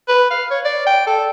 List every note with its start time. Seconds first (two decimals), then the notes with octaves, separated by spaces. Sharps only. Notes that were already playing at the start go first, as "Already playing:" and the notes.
0.08 B4
0.31 F5
0.51 C#5
0.65 D5
0.87 G5
1.07 A4